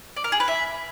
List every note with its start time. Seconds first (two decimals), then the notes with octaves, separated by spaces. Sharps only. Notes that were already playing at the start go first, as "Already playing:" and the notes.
0.16 D5
0.24 A#4
0.32 G#4
0.40 B4
0.48 E5